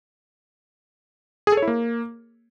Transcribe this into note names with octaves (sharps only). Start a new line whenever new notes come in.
G#4
A4
C#5
E4
A#3